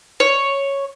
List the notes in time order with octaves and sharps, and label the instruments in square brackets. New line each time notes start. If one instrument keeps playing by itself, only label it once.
[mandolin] C#5